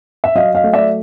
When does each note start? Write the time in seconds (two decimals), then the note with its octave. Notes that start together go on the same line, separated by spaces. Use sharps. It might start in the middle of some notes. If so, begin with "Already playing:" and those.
0.24 E5
0.35 F#3 D#5 F5
0.55 D#5 F5
0.64 A3
0.73 D5 E5